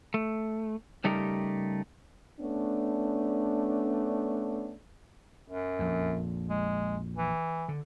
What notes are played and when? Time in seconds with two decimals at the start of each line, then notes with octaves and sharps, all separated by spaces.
0.14 A3
1.04 C#3 G3 A3 D#4 G4 A#4
2.40 A3 B3 C#4 D4
5.50 F#2
5.79 A#1 F2
6.49 G#3
7.16 E3
7.68 D3